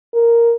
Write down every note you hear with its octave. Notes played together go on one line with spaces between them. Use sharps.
A#4